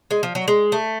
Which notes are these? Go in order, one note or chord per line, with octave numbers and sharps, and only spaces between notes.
G#3
F3
F#3
G#3
A3